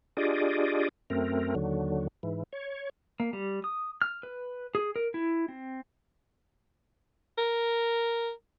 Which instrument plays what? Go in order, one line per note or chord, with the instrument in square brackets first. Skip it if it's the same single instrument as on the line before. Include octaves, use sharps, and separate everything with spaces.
[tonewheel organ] D4 F4 G4 G#4 D5 D#5
F#2 A3 C4 A#4
D#2 D3 F#3
G#2 E3
C#5
[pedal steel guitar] A#3
G3
D#6
F6
B4
G#4
A#4
E4
C4
[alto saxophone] A#4